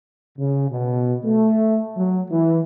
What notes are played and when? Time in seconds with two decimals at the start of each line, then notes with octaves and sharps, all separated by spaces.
0.38 C#3
0.69 B2
1.24 A3
1.96 F#3
2.30 E3